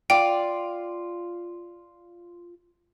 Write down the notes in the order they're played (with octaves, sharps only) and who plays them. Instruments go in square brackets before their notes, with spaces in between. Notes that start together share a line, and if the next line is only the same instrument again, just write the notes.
[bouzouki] F4 D5 [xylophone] G5